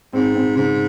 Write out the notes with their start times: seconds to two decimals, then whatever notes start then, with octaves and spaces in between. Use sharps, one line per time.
0.13 G#2 C4
0.34 C4
0.55 G#2 C#3